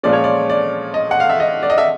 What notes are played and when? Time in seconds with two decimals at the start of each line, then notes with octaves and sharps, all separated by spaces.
0.03 A#2 F3 G#3 C#4 D5
0.13 C#5
0.24 D5
0.50 D5
0.94 D#5
1.11 F#5
1.20 F5
1.29 E5
1.40 D#5
1.63 D5
1.70 D#5
1.78 E5